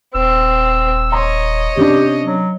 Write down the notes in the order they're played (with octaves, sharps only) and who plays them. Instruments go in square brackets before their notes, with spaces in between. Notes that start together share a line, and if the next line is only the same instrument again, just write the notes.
[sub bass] D#1 [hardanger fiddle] C4 [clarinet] E6
[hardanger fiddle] C#5 D#5 [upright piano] A#5 C6
[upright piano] C3 C#4 D4 [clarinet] G4
[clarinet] F#3